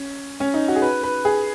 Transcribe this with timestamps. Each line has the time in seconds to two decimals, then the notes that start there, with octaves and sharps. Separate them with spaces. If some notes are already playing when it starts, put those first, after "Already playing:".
Already playing: C#4
0.40 C#4
0.54 D#4
0.68 F#4
0.76 G#4
0.82 B4
1.03 B4
1.25 G#4